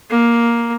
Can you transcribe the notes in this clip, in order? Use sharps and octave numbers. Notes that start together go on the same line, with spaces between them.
A#3